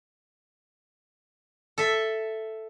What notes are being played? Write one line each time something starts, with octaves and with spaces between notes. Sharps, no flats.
A4 E5